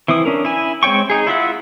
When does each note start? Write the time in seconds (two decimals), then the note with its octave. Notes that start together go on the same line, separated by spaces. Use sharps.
0.08 E3 C4 E4 D#6
0.25 C#4 D4 A#4
0.45 E4 G#5
0.83 G#3 C4 C#5 G5 C#6
1.10 D#4 G#4
1.27 E4 F4 E5 F#5